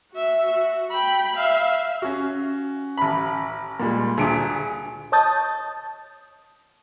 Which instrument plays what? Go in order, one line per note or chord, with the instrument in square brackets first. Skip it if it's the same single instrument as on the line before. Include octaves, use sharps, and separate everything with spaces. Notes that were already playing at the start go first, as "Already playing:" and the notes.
[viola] F#4 E5
F#4
G5 B5
E5 F5
[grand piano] C#4 F#4
[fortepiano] A1 B5
[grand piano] A#2 G3 G#3
[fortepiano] D2 A#2 [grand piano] G#4 D7
[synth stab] C#5 D#5 A5 D#6 G6 A6